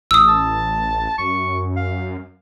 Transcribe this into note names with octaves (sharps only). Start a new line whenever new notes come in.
A1 D#6 E6
A5
F#2 C#6
F5